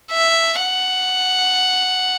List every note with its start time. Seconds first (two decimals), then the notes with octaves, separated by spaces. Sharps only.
0.12 E5
0.61 F#5